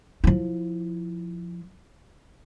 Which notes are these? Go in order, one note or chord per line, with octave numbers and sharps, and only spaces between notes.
F3 E4